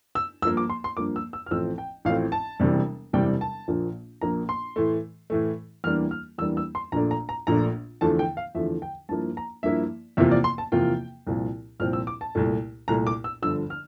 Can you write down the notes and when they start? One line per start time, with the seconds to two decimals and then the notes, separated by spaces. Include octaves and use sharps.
0.15 E6
0.42 G2 F3 A#3 E6
0.57 D6
0.70 C6
0.84 C6
0.97 G2 F3 A#3 D6
1.16 E6
1.33 E6
1.46 F6
1.51 A1 A2 F3 A3 C4 E6
1.78 G5
2.05 A1 A2 F3 A3 C4 F5
2.32 A5
2.60 E1 E2 C3 G3
3.13 E1 E2 C3 G3 G5
3.41 A5
3.68 A#1 A#2 F3 A#3
4.21 A#1 A#2 F3 A#3 A#5
4.49 C6
4.76 A2 E3 A3
5.30 A2 E3 A3
5.84 E2 E3 G3 A#3 D4 F6
6.11 F6
6.38 E2 E3 G3 A#3 D4 E6
6.57 E6
6.75 C6
6.92 A#1 A#2 A3 D4 A#5
7.11 A#5
7.29 A#5
7.47 A#1 A#2 A3 D4 A#5
8.01 E2 D3 F3 A3 A5
8.19 G5
8.37 F5
8.55 E2 D3 F3 A3 E5
8.82 G5
9.09 G2 F3 A#3 E4 A5
9.37 A#5
9.63 G2 F3 A#3 E4 E5
10.17 E2 C3 F3 A#3 F4 E5
10.32 D5
10.44 C6
10.58 A5
10.72 E2 C3 F3 A#3 F4 G5
11.27 C2 A#2 F3 C4 F4
11.80 C2 A#2 F3 C4 F4 F6
11.93 E6
12.07 D6
12.21 A5
12.35 C2 A#2 A3
12.88 C2 A#2 A3 A#5
13.07 D6
13.24 E6
13.42 G1 G2 D3 F3 E6
13.70 F6